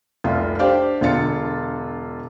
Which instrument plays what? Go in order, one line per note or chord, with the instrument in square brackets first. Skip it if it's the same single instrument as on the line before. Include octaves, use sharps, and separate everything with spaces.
[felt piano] F1 C2 F4
D4 G4 C5 D5 F5 G5
E1 D3 F4 A6 C#7